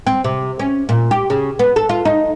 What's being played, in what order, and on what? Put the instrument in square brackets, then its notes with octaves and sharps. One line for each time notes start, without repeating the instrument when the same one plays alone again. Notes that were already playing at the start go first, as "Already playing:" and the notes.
[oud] C4
C3
C#4
A#2
G4
C#3
B3
A4
F4
D#4